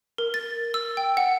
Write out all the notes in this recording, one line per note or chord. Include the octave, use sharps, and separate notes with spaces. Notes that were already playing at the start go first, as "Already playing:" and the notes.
A#4
A6
E6
G5
F#5